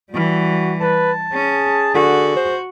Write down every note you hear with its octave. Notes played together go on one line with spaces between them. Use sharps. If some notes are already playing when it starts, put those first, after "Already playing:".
E3 G3 F#4
B4 A5
C#4 G#4
D3 F#4
C5